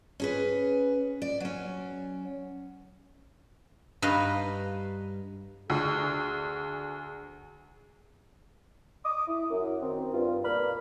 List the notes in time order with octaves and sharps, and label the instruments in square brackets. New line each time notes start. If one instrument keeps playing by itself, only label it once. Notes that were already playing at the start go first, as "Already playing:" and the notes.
[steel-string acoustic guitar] C#4 G#4 B4
D5
F#3 C#4
[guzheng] G2 D#4 B4 D#5 F5
[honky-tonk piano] D2 [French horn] G#4
[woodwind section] D6 D#6
E4
F#2
D#3 C4
G2 F4
B2 A#3 D5 F5 B5 F6